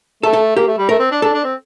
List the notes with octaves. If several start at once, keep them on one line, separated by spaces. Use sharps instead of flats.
A3 A4
A4
A#3 G4
A3
G3
A3 A#4
C4
D4
D4 A4
D4
C4